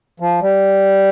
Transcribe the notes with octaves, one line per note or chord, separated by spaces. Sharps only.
F3
G3